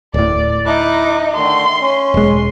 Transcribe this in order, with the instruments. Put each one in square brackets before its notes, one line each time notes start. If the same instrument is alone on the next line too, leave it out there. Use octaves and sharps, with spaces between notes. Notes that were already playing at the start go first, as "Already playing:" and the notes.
[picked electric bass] D1 A2 [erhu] D5
[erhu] D#4 [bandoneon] E4 D6 F#6
[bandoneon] D3 D#3 A3 [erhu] C6
[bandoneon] C#4
[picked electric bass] E1 G#3 [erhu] C6